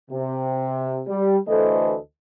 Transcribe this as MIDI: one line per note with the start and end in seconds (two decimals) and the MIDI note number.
0.11 1.00 48
1.07 1.37 55
1.48 1.96 38
1.48 1.96 52
1.48 1.96 57
1.48 1.96 69
1.48 1.96 72
1.48 1.96 75